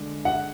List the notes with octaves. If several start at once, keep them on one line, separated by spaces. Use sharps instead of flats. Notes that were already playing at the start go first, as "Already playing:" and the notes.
Already playing: D3 G#3 D4
F#5